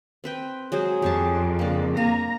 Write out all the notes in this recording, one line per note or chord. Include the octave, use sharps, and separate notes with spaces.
C4 B4 G5
F#3 G#3 G#4 C5
F2 G4 C#5 A5
C#3 A#3 D4
A#3 F5 G#5 A#5